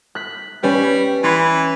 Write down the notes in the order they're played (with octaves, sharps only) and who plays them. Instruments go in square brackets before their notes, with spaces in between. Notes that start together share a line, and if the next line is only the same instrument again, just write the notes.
[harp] F#6 B6
[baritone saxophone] G3 [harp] C#4 B4
[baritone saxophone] E3 [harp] B5 C6 G#6